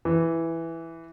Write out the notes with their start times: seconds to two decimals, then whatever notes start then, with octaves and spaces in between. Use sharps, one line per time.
0.05 E3